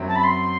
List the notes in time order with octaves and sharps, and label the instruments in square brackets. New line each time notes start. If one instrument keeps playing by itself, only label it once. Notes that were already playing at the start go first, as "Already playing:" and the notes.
Already playing: [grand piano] F#2 F#3 C4 E4
[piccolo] A5
B5
C6